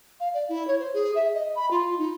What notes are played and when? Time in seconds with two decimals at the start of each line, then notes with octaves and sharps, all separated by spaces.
0.20 F5
0.34 D5
0.49 E4
0.67 C#5
0.80 C5
0.94 G#4
1.15 E5
1.34 D#5
1.56 B5
1.71 F4
1.98 D#4